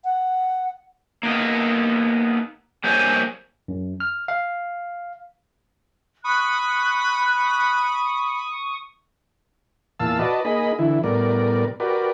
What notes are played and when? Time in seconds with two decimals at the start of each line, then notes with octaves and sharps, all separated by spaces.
0.05 F#5
1.23 A#3 B3 D#4
2.84 G3 A#3 C5 C#5 G#5
3.68 F#2
4.00 F6
4.28 F5
6.24 B5 C#6 D#6 F#6
10.00 E2 A#2 F5 A5 E6
10.19 F#4 B4 D5 D#5 A5
10.45 A#3 D#4 G#4 D#5 B5
10.79 D3 E3 E4
11.04 A2 G3 B3 A#4 D5
11.80 F#4 G4 A#4 B4 D5